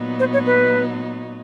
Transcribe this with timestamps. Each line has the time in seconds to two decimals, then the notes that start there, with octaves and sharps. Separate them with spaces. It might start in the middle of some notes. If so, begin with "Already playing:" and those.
Already playing: A#2 F#3 B3 D#4
0.20 C5
0.33 C#5
0.46 B4